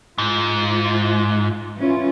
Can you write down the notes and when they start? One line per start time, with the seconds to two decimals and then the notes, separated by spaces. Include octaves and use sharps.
0.18 G#2 F4
1.77 E3 C#4 F4